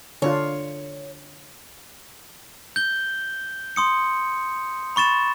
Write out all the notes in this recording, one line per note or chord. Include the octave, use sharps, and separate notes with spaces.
D3 D4 F4 C#5
G6 G7
C6 D#6 C#7
B5 C#6 A6 E7